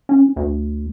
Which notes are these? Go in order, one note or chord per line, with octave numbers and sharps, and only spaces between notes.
C#4
D2